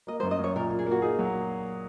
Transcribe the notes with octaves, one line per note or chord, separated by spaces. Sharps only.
A#3 D#5
F#2 C5
D#5
F#2 C#5
A#2 A#4
A#2
G#4
A#3
F#4
D#4 G#4
F#3